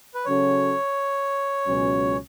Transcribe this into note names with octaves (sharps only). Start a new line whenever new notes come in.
B4
C#3 F#3 C#4 F#4 A4 C#5
C#2 B2 F#3 C#4